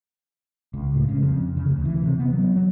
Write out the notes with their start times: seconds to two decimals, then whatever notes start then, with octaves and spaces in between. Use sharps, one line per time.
0.74 C#2
0.94 A2
1.09 C#3
1.23 F2
1.57 C#3
1.69 D2
1.85 E3
2.03 C3
2.19 B3
2.33 F#3
2.56 F#3